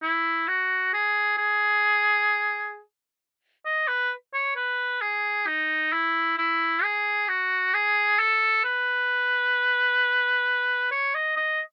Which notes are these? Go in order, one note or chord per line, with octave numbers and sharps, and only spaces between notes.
E4
F#4
G#4
G#4
D#5
B4
C#5
B4
G#4
D#4
E4
E4
G#4
F#4
G#4
A4
B4
C#5
D#5
D#5